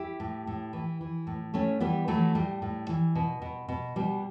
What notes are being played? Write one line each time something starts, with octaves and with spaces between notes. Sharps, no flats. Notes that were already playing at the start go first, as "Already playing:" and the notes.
Already playing: E4 G4
A2
A2
E3
E3
A2
A2 A3 C#4
E3 G3 B3
E3 F#3 A3
A2 G3
A2
E3
B2
B2
B2
B2 G3